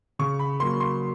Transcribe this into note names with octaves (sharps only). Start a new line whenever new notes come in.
C#3 C#6
B5
F#3 A#3 C6
C6